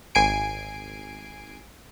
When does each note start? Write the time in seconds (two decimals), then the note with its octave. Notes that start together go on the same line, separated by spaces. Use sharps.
0.15 G#1 G#5 C7 D7